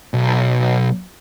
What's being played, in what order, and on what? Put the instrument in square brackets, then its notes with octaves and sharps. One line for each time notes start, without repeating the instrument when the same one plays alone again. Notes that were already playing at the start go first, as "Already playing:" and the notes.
[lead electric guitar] B1